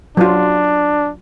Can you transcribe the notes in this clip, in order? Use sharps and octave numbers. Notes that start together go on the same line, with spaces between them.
F#3 D4 F4